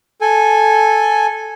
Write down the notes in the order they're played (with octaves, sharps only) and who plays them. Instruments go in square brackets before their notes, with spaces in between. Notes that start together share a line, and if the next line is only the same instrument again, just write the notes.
[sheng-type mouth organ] A4 G#5